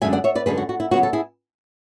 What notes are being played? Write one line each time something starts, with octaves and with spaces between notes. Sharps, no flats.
F#2 D3 G#3 E5 G#5
D5 F#5
C#5 E5
B4 D5
F#2 D3 G#3 G#4 B4
F#4
F#4
E4
C#3 F#3 B3 F#4
A4
E4 G#4